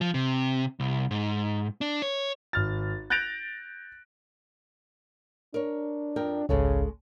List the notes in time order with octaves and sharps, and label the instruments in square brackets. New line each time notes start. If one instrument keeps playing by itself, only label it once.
[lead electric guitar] F3
C3
C2
G#2
D4
C#5
[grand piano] G#1 F6 A6
F#6 G6 A6 A#6 D7 F7
[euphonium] D4 [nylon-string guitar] A#4 C#5
[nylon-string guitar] F2 A#4 G5
[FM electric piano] G#1 C#2 [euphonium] C#3 [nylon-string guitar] G#3 A4 C#5